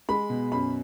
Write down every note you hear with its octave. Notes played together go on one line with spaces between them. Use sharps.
G#3 B5
B2
F#2 B5